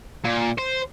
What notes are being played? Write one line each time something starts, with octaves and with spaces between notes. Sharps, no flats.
A#2
C5